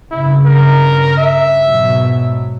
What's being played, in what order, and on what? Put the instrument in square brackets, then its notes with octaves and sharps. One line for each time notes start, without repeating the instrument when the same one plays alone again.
[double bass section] G2 C#3 [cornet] E4
[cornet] A#4
E5
[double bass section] G#2 B2 F#3